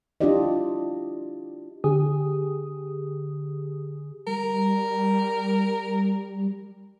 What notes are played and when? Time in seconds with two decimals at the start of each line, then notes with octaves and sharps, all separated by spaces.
0.21 D4 E4 F4 G4 D5 D#5
1.84 D3 G4 G#4 D#6
4.27 G3 A#4